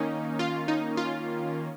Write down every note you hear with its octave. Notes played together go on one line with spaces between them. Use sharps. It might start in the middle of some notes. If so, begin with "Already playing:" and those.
Already playing: D#3 A#3 C#4 D#4
F4
D#4
F4